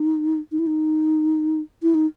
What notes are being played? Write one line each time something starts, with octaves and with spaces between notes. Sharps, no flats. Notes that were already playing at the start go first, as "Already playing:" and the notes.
Already playing: D#4
D#4
E4
D#4
E4
D#4